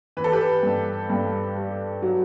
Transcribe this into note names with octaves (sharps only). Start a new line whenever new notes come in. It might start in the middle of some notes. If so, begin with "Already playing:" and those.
E3 B4
A4
G4 B4
G2
G2
G3
F#3